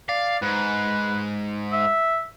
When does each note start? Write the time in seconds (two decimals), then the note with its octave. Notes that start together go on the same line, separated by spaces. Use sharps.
0.09 D5 F5
0.42 G#2 B4
1.72 E5